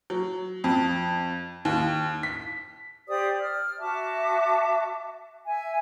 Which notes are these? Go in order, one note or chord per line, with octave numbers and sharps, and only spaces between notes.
F#3
F2
D#2
B6
G4 C5 D5 D#6
F6
F#4 E5 A5 D6
E5 G#5